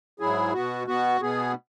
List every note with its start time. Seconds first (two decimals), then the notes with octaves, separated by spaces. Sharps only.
0.20 G#2 F#3 E4 G#4
0.53 B2 B3 F#4
0.87 B2 B3 F#4
1.21 B2 B3 G#4